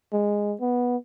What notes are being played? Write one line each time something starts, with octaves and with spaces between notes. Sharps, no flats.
G#3
B3